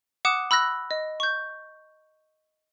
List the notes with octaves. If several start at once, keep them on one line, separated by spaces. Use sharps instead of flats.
F#5 D6 D#6 F#6 E7
B5 E6 F#6 A#6
D#5
C#6 G6